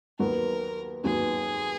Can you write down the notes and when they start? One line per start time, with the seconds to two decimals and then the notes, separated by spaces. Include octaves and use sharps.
0.19 D#2 D#3 F#3 B3 F#4 A#4
1.04 D#2 D#3 F#3 B3 F#4 G#4